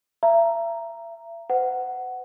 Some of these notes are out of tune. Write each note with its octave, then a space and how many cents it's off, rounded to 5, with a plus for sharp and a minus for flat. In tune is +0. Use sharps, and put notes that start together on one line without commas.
E5 +35 A#5 +0
C5 -45 F#5 +10